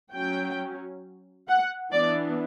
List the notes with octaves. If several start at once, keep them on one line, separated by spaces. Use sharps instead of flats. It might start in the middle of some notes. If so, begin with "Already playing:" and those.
F#3 C#4 G5
F#5
E3 B3 D4 D5